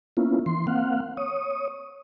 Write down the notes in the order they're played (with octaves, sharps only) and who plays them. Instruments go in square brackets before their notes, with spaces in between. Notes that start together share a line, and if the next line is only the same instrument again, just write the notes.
[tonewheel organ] A#3 B3 C#4 E4 F4
E3 C6
A#3 C4 F5 F#5
C#5 D#6